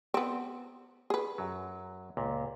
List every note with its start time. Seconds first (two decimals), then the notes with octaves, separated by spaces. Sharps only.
0.14 B3 C4
1.10 G#4 B4
1.38 F#2 F#3
2.17 C#2 A#2